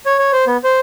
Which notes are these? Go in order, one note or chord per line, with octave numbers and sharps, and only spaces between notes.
C#5
C#5
C5
B3
C5